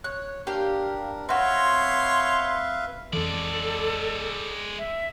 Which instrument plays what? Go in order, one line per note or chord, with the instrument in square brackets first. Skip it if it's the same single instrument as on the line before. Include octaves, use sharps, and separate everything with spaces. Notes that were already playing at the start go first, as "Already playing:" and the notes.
[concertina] C#5 [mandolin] F#6
[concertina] D4 A#4 [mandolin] G4 F5
[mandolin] C4 F#4 [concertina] B4 E5 F5 [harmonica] C#5 C6
[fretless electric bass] F2 E3 [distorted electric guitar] G#3 D5 [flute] A4
[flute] E5